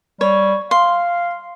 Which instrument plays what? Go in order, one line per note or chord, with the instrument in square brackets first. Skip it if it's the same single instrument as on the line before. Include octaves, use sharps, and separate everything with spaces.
[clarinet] G3 [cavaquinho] C#5
[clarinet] F5 [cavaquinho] C6